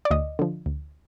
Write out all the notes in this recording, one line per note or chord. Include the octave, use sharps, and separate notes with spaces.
D5
D2 D#5
D3 F3
D2